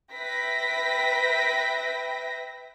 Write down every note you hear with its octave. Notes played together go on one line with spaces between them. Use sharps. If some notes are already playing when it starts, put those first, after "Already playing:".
B4 E5 G5 A#6 B6